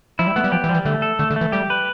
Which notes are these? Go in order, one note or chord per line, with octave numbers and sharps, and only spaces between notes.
F3 E4
G3
A3 B3
G3
F3 G4
E3
F3 G3
E3
D3 A3
A4
D3 A3
D3
A3
E3
G3 G4
B4